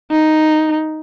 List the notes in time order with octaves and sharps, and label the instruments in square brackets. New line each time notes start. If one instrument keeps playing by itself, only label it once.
[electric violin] D#4